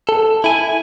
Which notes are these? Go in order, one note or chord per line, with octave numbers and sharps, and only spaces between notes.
A4
E4 G#5